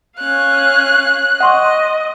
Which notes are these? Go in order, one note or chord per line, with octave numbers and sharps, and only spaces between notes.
C#4 F5 F#6
D#5 F#5 C6 C#6